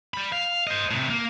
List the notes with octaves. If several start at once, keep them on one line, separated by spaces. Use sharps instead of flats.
G3 B5
F5
C5 D#5
A2 C3
A#3